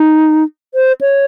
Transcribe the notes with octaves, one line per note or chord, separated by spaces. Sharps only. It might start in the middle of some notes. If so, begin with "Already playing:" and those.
Already playing: D#4
C5
C#5